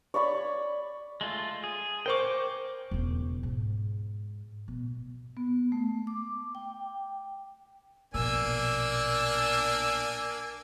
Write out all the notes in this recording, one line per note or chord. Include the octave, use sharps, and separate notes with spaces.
C#5 D5 B5 C#6
G#3 A3 F4
G#4
A#4 C5 G5 C#6 D6
E1 C#3
G#2
B2
B3
A3
D6
G5
A#1 B2 A#3 D4 G#5 E6